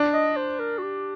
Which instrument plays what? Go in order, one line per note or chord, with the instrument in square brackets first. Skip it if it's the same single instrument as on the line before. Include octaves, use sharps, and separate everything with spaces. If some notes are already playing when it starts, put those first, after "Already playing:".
Already playing: [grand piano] D4
[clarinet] D#5
C5
A#4
F#4
G4